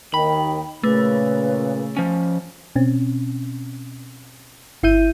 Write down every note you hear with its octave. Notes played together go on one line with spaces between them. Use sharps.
D#2 D#3 G5 B5
A#2 C#3 A3 B4
F3 C#4
B2 C4 C#4
G1 E4 E5 G6 D#7